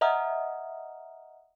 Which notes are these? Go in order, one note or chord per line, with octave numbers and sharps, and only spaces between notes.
D#5 E5 F#5 A#5 D#6 F6